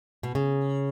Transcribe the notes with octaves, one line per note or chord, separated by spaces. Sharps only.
B2
C#3